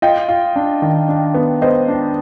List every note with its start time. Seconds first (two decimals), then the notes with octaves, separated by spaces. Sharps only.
0.02 F4 D#5 G5
0.29 F4
0.56 D4
0.82 D#3
1.08 D4
1.34 B3
1.62 B3 C5 D#5
1.88 D4